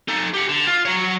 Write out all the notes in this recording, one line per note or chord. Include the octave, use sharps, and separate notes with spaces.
D#4 A4
G4 F#5
D3
F4
F#3 C#5